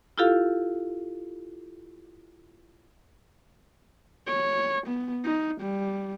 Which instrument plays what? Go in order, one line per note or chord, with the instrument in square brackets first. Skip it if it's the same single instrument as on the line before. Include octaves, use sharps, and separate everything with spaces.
[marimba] E4 F4 G4 A4 F5
[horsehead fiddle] C#5
B3
D#4
G3